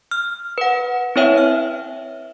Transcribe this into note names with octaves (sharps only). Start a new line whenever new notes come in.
F6
B4 F#5
C4 E4 B4 C#5 E5 G5
F6